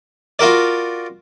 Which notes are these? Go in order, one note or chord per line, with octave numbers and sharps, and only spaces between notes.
F4 F#4 A#4 D5